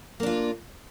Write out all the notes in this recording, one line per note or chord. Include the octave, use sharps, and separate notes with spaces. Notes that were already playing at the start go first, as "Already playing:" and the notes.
A#3 D4 F4